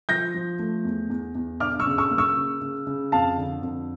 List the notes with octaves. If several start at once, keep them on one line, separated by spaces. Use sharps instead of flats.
F3 G6 A#6
F3
A3
E2
E2
E2
D4 D6 F6
C#6 E6
C#3
C#6 E6
A#3
C#6 E6
C#3
C#3
C#3
F2 F5 A5
D3
F2